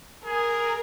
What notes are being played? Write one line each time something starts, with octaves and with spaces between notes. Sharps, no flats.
G#4 A#4